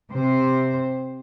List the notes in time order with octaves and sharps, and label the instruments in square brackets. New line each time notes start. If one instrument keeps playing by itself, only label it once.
[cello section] C3 C5